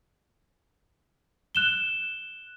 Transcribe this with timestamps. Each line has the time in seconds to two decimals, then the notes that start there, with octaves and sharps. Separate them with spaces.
1.55 F#6 E7 G7